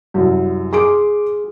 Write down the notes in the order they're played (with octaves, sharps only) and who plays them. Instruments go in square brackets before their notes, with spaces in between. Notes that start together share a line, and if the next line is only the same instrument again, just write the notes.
[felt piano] C2 F#2
[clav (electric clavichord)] G#4 [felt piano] C6 D6 D7